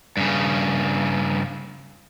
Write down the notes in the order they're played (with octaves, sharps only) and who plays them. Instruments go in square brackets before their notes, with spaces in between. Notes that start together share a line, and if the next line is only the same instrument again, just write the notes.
[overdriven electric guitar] G2 C#3